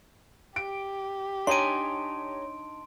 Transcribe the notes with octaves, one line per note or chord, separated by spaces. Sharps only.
G4 D7
D4 D#4 C#5 G#5 A#5 C6 D7